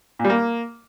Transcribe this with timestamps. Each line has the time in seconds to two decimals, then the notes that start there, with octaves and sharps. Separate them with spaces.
0.19 A#2
0.25 G3
0.30 A#3